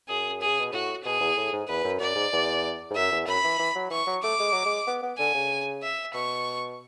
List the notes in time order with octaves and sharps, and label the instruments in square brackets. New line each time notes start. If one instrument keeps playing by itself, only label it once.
[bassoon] F#2 [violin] G#4
[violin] G#4
[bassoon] C#3
B2
[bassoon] A2 [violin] F#4
[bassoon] B2 [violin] G#4
[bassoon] E2
A2
G#2
[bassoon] E2 [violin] B4
[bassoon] F#2
[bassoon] F#2 [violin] D5
[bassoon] G#2
E2
G#2
[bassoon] F#2 [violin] E5
[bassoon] E2
[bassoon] F#2 [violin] B5
[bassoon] E3
E3
F#3
[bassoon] E3 [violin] C#6
[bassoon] F#3
[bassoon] A3 [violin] D6
[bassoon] G#3
F#3
G#3
B3
B3
[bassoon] D3 [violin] G#5
[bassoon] C#3
[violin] E5
[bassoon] B2 [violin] C#6